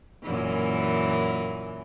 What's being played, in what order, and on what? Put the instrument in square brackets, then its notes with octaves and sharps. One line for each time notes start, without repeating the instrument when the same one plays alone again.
[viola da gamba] F#2 A#2 E3